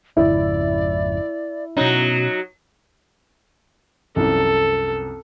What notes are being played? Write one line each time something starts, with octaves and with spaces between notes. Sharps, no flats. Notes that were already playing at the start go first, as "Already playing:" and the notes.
G#1 F2 C#3 E4 D5
B2 F#3 B3 C#4 D#4
C2 F#2 F3 A4